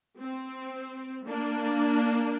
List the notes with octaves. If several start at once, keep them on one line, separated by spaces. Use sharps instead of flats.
C4
A#3 D4